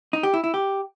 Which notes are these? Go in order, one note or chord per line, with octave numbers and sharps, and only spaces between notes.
D#4
G4
E4
E4
G4